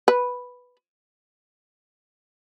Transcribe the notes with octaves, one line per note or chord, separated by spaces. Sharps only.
B4